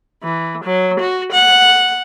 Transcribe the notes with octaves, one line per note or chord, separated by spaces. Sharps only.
E3
F#3
F#4
F#5